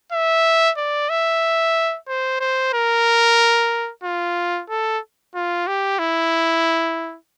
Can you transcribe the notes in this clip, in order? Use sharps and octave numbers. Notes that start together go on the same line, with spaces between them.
E5
D5
E5
C5
C5
A#4
F4
A4
F4
G4
E4